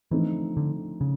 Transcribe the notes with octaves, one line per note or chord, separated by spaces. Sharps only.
D3 E3 F3 A3 C4 D#4
D3
C#3